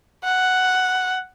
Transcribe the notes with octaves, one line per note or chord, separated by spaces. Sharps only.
F#5